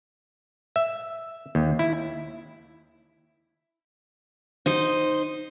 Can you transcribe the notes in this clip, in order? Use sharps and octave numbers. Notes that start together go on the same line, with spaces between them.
E5
D#2
E4
D#4 C5